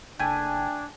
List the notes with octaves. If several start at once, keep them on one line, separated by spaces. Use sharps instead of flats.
F#1 A3 D4 G5 G#5